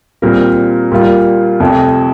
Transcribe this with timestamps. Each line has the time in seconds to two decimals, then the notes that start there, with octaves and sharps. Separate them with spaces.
0.22 A#2 G3 C4 F4 A#4
0.92 A#2 G3 A#3 F4
1.60 F1 F2 C3